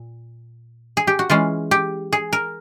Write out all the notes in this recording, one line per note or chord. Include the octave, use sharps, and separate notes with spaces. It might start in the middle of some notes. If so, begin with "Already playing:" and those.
Already playing: A#2
G#4
G4
F#4
E3 G#3 C#4 F4
G4
G#4
A#4